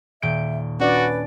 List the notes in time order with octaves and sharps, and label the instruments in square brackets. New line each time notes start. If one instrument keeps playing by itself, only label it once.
[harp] D#1 G6 D7 [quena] E5
[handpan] C#4 D4 D5 [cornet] F#4 [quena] B4